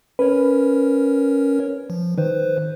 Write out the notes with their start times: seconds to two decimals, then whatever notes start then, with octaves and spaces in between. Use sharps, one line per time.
0.19 C#4 A#4 B4 C#5
1.90 F3
2.18 D#3 B4 C5